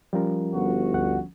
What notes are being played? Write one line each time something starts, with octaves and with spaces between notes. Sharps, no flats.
F3 G3 C#4 F4 A#4
G1 F#4
D2 F#5